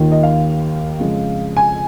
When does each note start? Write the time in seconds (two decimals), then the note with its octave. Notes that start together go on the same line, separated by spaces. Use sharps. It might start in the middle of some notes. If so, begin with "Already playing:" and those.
Already playing: D#2 D#3 A#3 F4
0.12 D#5
0.23 F5
1.00 F2 C#3 G#3
1.57 G#5